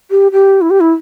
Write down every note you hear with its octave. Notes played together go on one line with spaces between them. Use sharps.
G4
G4
E4
G4
E4